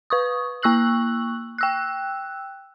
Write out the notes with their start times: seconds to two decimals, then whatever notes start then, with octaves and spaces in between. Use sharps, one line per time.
0.10 B4 C#6 D#6
0.63 A#3 C#6 E6 F#6 F#7
1.58 G5 E6 F#6